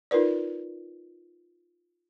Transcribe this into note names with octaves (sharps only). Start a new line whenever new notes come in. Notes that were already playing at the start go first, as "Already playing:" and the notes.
D#4 F4 A#4 B4 D5